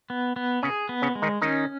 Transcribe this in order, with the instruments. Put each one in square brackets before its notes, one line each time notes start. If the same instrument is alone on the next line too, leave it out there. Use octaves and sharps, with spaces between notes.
[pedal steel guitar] B3
B3
[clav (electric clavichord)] C#3 C#4 [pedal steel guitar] G#4
[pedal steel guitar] B3
[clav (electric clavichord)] C#3 C#4
[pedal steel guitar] G#3
[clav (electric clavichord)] D#3 D#4
[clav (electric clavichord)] D#3 D#4 [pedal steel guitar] C#4